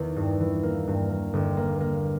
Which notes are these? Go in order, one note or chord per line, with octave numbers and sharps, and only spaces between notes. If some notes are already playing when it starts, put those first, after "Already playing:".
Already playing: E2 D#3
G2
E3
A#3
G2
A#3
G1
A#3
A#3